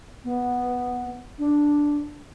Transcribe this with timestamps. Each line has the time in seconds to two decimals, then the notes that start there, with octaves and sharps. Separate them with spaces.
0.24 B3
1.38 D4